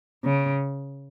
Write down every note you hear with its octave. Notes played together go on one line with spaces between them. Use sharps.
C#3